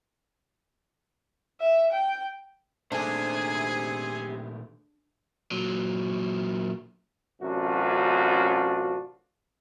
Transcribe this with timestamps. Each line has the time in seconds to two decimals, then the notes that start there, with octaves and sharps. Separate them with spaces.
1.61 E5
1.92 G5
2.92 A#2 D#3 A3 D4 G4 G#4 C5
5.51 A#2 F#3
7.42 A1 F#2 C3 D4 F4 F#4